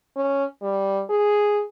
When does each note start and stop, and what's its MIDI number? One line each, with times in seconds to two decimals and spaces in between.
0.16 0.45 61
0.62 1.03 55
1.10 1.63 68